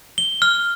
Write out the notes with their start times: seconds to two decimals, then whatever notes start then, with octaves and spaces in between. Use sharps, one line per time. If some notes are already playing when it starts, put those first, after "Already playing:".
0.18 G7
0.42 F6